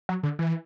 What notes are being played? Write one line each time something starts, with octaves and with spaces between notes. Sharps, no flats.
F#3
D3
E3